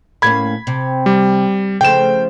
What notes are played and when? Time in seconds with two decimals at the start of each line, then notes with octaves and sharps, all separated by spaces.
0.22 A2 A#3 C#4 B5 G#6
0.67 C3
1.06 G3
1.81 C#3 F3 A3 G5 E7